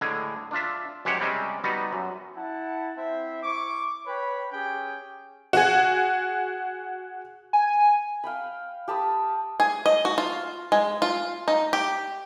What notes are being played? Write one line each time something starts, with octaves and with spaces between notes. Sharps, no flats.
A2 D3 G#3 G#4
D4 F4 E5
F#2 G#3 G4 C5 C#5 F#5
C3 G3 G#3 C4 C#4
G3 B3 D#4 F#4
F#2
E4 F#5 A5
C4 E4 C5 E5
E4 C#6 D6
B4 C#5 G5 B5
C#4 G4 G#4 G5
F#4 G#4
G#5
F5 G5 B5
G4 A5 B5 D#6
G#4
D#5
F#4
F4
G#3
F4
D#4
G4